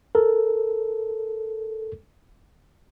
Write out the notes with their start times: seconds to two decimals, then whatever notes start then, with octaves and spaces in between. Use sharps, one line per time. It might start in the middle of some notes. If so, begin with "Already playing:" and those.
0.15 A4 A#4